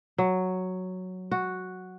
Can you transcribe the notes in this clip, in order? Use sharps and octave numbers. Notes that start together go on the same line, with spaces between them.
F#3
F#4